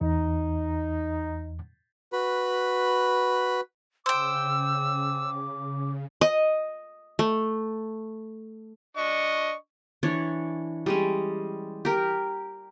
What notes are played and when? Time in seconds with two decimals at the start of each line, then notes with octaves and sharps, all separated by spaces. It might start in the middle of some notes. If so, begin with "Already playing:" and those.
0.01 E2 D#4
2.13 F#4 B4 B5
4.06 C#3 C5 G5 D6 E6
6.21 D#5
7.19 A3
8.97 D4 D#5 C#6
10.03 E3 D4 C#5 D5
10.86 G3 G#3 C#4
11.85 G4 A#4